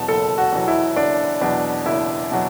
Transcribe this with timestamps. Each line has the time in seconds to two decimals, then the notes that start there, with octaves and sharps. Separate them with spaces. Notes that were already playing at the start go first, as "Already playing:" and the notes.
Already playing: E2 B2 F#3 A5
0.08 F#1 A4
0.38 F#4
0.52 E2 B2 F#3
0.68 E4
0.96 F#1 D4
1.41 E2 B2 F#3 D4
1.86 F#1 E4
2.31 B2 F#3